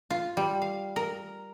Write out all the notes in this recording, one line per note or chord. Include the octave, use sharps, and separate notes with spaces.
F4
G3
F5
A#4